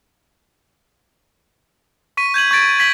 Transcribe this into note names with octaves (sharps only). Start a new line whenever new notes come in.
C#6 B6 D#7
G6 G#6 D#7 F#7
C#6 G#6 A6 D7
G#6 B6 F#7